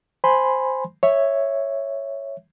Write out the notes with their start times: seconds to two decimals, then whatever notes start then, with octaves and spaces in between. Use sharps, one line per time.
0.24 C5 G#5 B5 C6
1.03 C#5 E5